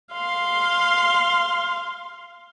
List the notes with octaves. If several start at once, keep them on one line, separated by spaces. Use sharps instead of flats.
F5 C6